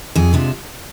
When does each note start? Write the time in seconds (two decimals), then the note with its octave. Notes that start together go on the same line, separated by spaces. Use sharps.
0.15 F2 G#4
0.33 C3 G#3 D4 F4